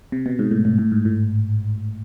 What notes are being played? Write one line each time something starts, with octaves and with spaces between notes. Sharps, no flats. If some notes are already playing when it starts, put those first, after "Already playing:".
C3
B2
G#2
A2
A2
A2
G#2
A2